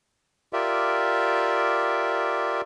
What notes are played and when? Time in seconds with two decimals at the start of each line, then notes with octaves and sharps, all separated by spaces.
0.53 F4 G4 A#4 D5 E5